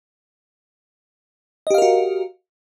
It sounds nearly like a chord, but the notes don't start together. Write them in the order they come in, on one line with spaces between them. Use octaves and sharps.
D#5 G4 F5 A#4 F#4